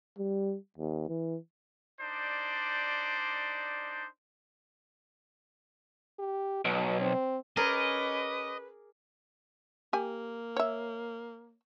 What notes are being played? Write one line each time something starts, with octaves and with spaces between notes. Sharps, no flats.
G3
D#2
E3
D4 D#4 C5 D5
G4
B1 B2
C4
C#4 G#4 A#4 B4 D5 D#5 D6
A#3 G4 G#5
C#5 E5